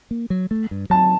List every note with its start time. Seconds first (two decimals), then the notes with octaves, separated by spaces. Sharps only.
0.11 A#3
0.30 F#3
0.51 A3
0.71 G2
0.90 F#3 A5